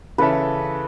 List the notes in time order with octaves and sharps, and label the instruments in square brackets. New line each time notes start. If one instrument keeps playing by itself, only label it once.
[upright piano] C#3 E3 C#4 A4 E5 [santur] B4